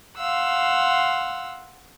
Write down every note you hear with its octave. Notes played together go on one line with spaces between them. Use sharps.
F5 F#5 C6 E6